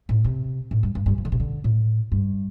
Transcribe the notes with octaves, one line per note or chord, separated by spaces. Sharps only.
A2
C3
A2
G2
G2
G2
F3
D3
C3
D3
A2
G2